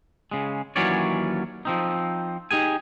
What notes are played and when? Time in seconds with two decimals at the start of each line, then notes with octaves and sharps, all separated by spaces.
0.31 C#3 G#3
0.76 D#2 E3 F#3 C#4 C#5 D5
1.65 F3 C4 D#4
2.51 D#4 G4 G#4 G#5